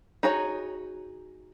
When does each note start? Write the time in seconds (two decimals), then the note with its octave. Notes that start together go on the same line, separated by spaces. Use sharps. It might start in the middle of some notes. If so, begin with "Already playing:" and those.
0.23 D#4 F#4 G#4 C#5 A#5